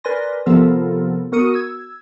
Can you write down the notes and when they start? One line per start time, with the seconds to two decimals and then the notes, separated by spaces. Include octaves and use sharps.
0.04 A#4 B4 D5 G#5 C6 A#6
0.46 C3 F3 B3 F4 A4 A#4
1.32 B3 F#4 A#4 D#6 C#7 D#7
1.54 E6 G#6